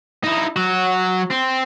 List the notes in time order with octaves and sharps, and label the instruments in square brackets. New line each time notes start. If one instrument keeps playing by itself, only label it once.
[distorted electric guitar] D#4 E4
F#3 F#4
C4